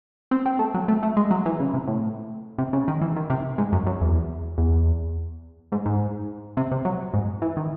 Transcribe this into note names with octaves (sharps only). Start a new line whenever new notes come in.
C4
C4
A3
F#3
A3
A3
G#3
F#3
E3
C#3
C3
A2
C3
C#3
D#3
E3
D#3
C3
G#2
F#2
F#2
E2
E2
G#2
G#2
C3
C3
F#3
G#2
E3
D#3